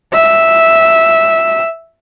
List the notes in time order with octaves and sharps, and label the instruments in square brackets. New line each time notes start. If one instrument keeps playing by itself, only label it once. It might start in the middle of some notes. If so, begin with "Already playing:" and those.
[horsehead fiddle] E5